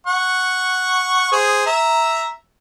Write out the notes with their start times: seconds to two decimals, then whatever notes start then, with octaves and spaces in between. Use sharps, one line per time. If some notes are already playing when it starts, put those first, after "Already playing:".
0.07 F#5 C#6
1.32 G#4 C5
1.66 E5 A#5